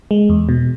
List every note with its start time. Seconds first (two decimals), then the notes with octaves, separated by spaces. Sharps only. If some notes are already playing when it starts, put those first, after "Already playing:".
0.11 G#3
0.29 E2
0.49 B2